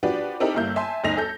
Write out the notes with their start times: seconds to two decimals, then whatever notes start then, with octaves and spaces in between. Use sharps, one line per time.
0.03 F3 D4 F#4 G4 B4 D5
0.40 C4 D#4 E4 G4 A4 A#4
0.55 G1 G2 A#3 E4 G6
0.76 E5 G#5 A5 C6
1.04 G1 D2 D#4 G#5 A#6 F7
1.17 A4 G6